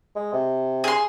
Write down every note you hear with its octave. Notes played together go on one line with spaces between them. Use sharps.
G#3
C3
G#4 C6